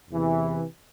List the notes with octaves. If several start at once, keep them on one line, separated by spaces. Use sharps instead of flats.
E2 C3 E3